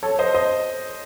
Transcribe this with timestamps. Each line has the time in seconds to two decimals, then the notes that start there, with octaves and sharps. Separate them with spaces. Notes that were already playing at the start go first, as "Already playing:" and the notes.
0.03 A4 C#5
0.19 C5 D#5
0.34 C5 D#5